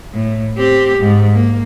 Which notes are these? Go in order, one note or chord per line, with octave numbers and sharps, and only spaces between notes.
A2
C4 G4
G#2
A#3